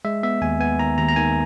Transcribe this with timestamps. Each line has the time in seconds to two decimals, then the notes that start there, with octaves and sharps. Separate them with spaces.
0.05 G#3 E5
0.23 B3 E5
0.42 D#2 G#5
0.60 B3 G#5
0.79 D#3 A#5
0.98 D#2 A#5
1.09 A#5
1.16 D#3 G#5